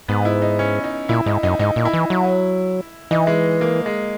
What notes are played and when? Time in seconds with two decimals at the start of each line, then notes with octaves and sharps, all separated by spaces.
0.08 G#2 B3
0.25 E4
0.42 D#4
0.59 C#4
0.84 D#4
1.09 A#2 E4
1.26 G#2 D#4
1.43 F#2 D#4
1.59 G#2 D#4
1.76 A#2
1.85 E4
1.93 E3
2.10 F#3
3.11 E3 D#4
3.27 G#3
3.61 A#3
3.86 G#3